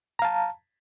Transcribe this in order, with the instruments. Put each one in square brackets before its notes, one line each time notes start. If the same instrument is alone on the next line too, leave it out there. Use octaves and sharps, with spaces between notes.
[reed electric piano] A#5
F5
A5